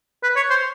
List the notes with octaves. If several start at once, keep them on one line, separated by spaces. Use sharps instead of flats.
B4
C#5
C5